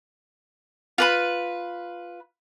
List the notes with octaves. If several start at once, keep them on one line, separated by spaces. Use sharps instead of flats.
F4 B4 B5